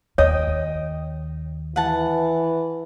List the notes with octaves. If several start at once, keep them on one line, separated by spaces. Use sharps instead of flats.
D#2 C#5 D#5 G5 D#6
E3 F#5 A5